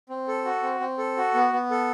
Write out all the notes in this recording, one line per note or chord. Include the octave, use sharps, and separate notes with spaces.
C4
A4
F#4
C4
C4
A4
F#4
B3
B3
A4